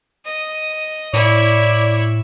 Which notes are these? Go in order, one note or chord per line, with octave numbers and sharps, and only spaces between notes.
D#5
A2 E4 C#5 D5